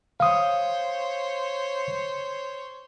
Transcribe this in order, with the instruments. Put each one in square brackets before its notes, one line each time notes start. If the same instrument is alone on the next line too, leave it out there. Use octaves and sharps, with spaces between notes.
[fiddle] C5 C#5 [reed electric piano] F5 D#6